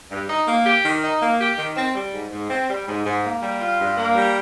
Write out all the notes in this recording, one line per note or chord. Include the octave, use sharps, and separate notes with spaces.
G2
D#4
A#3
G4
D#3
D#4
A#3
G4
D#3
C4
G3
G#2
G#2
C4
G3
G#2
G#2
A#3
G3
F4
G2
A#3
G3